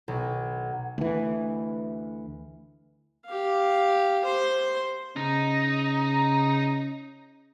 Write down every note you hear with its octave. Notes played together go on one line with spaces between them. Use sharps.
B1
D2 E3
G4 F5
C5 C6
C#3 D#4